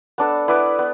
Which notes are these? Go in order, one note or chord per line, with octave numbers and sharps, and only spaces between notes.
B3 D4 A4
B3 E4 B4 D5
B3